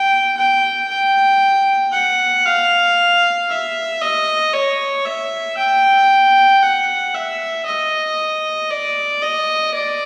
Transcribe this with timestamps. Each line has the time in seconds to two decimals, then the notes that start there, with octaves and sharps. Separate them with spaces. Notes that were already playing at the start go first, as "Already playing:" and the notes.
Already playing: G5
0.37 G5
0.88 G5
1.92 F#5
2.45 F5
3.49 E5
4.01 D#5
4.53 C#5
5.05 E5
5.57 G5
6.62 F#5
7.14 E5
7.66 D#5
8.70 D5
9.22 D#5
9.74 D5